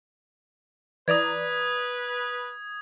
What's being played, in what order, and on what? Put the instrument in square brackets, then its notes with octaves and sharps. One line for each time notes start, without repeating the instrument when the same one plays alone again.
[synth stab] E3 D5 A#5 [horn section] B4 [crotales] D#6 G#6